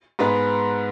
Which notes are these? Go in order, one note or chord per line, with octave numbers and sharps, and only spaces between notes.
G#2 G#3 B3 B4